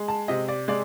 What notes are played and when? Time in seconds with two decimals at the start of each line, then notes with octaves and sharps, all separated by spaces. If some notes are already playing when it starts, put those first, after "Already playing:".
Already playing: G#3
0.08 A5
0.28 C3 D#5
0.48 D5
0.68 G#3 D5